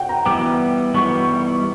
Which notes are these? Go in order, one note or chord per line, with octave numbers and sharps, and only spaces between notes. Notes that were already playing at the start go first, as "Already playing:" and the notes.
Already playing: F#5 G5
A#5
E3 G3 B3 D6
E3 G3 B3 C#6